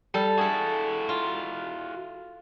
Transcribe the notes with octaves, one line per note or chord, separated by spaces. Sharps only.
G3 A4
E4 F#4 G#4 A4
F4